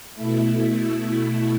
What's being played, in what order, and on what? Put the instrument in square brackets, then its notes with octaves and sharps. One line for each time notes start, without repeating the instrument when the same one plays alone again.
[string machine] B2 A3 E4